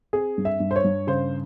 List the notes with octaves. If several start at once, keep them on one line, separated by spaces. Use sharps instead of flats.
C4 G#4
G2
E5
G2
C5
C#5
G2
C#3 C5